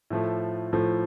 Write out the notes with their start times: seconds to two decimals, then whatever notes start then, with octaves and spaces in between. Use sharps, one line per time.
0.10 A2 F3 A3
0.73 A2 F3 A3